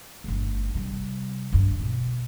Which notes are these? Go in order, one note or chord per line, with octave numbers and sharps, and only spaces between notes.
G1 A3
C3 G3
G1 G2
B2